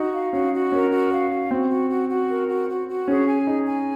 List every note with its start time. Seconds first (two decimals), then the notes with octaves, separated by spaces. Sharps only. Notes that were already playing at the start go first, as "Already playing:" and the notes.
Already playing: D#4 F#4
0.13 F5
0.33 C#4 F#4
0.53 F#4
0.72 C#4 A#4
0.92 F#4
1.11 F5
1.31 F#4
1.51 C4 F#4
1.71 F#4
1.89 F#4
2.10 F#4
2.29 A#4
2.49 F#4
2.69 F#4
2.89 F#4
3.08 C#4 G#4
3.27 G#5
3.47 D#4 G#4
3.66 G#5